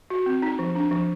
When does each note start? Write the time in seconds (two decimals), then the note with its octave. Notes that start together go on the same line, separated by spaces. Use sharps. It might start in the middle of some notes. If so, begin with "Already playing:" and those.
0.10 F#4
0.26 C4
0.42 D#4
0.59 F3
0.75 D4
0.91 F3